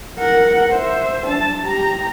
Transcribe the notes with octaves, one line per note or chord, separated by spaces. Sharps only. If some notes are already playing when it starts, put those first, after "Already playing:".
A#4 F#5
C5 E5
D4 A5
G4 A#5